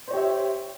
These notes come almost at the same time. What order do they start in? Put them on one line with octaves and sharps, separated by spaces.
C5 C#5 G4 E5